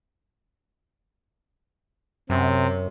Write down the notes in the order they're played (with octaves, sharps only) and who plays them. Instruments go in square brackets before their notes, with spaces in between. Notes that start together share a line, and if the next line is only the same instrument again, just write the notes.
[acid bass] F#2 [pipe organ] C3